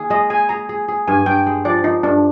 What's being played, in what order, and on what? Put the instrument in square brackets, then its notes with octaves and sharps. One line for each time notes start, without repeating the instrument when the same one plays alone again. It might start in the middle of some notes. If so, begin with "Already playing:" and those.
Already playing: [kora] D#3 A#3 G#4
[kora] G#3 [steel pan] D#5
[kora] G#4 [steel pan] G#5
[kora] G#4 [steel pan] A#5
[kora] G#4
G#4
[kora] G2 [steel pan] G#5
[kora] G2 [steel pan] G5
[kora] G#3
[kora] F3 [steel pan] D5
[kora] F3 [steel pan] D#4
[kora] G2 [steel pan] D4